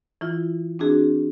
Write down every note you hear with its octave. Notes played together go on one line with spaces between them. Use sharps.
E3 E4 F4
C4 D4 F#4 G#4